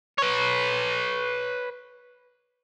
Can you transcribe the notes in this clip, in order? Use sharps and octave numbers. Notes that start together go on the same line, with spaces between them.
B4 C#5